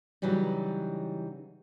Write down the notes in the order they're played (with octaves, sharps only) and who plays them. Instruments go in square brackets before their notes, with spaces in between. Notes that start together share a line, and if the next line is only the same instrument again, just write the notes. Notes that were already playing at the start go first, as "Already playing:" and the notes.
[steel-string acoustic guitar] C#3 E3 F#3 G3 D#4